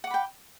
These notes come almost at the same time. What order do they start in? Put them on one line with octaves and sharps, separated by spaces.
F#5 D6 B5 G5